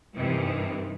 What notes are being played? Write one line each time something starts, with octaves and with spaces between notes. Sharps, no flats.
G2 C3 D#3 E3